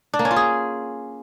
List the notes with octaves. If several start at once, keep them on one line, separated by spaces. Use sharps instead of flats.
D4
A#3
C#4
F4
G#4